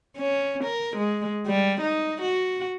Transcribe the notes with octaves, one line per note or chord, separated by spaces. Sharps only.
C#4
A#4
G#3
G3
D#4
F#4